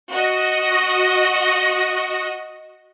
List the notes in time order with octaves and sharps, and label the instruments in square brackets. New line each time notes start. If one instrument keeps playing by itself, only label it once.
[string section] F#4 D#5